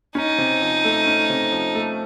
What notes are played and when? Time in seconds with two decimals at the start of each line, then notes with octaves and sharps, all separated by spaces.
0.15 C#4 D#4
0.38 C3
0.61 F3
0.85 A3
1.07 C#4
1.30 C3
1.52 F3
1.75 A3